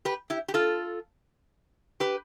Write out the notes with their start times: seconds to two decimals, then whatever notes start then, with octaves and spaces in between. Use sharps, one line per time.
0.05 G4 B4
0.30 E4 G4
0.48 G4
0.54 F4 A4
2.00 G4 B4